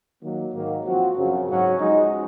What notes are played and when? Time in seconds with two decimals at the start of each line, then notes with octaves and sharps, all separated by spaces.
0.21 D#3 F#3 A#3
0.53 G#2 D#3 F#3 A#3
0.84 F3 C4 F#4
1.16 F#2 C#3 F#3
1.48 G#2 F#3 C#4 F#4
1.79 F3 G#3 D#4 F#4